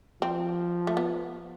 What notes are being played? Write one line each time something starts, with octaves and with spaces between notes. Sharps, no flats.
F3 C4
A3
B3